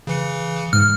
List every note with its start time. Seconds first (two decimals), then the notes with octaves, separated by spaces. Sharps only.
0.07 C#3 E3 C#7
0.73 G#2 F6